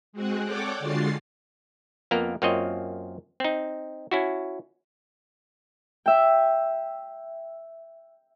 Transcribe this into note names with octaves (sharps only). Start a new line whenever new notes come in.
G#3 C4 F#4 G#4 F#5
A4 C#5 D5 F#5 G5 D6
D3 G#3 F4 F#4 A6 C7
F2 A#3 B3 A#4 A#5
F#2 A#3 C4 F4 C#5 D#5
C4 D#4
C#4 E4 F#4
E5 G5